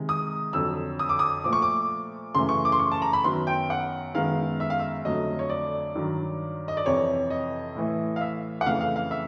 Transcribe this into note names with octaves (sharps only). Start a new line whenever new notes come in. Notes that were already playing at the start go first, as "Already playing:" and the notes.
Already playing: C3 D#3 G#3
D#6
F2 D3 F#3 E6
D#6
D6
D#6
A#2 F3 A3 D6
C#6
D6
F#2 C#3 E3 A3 C6
C#6
D6
C6
C#6
A5
A#5
B5
F#2 D#3 F#3 B3 C6
G5
F#5
F#2 D#3 G#3 B3 F5
E5
F5
E5
F2 D3 F#3 A3 D#5
C#5
D5
G2 D#3 F#3
D#5
D5
F2 C3 E3 C#5
D#5
A2 E3 A3
F5
E5
F#5
F2 C#3 E3 A3 F5
F5
F5
E5